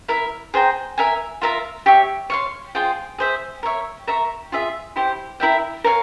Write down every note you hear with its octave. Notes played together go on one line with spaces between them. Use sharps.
E4 A#4 E5
G#4 C5 G5 A#5
A#4 E5 G#5
F4 A#4 E5 A#5
G4 C#5 E5
C#5 F5 C6
F4 G#4 C5 G5
G#4 C5 E5
A#4 C#5 E5
A#4 E5 A#5 C#6
F4 G#4 E5
E4 G4 C5
E4 A#4 E5 G5
A#4 C#5 F5 G#5